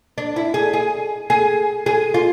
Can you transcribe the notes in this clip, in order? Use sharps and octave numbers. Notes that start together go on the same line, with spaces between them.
D4
E4
G#4
G#4
G#4
G#4
F4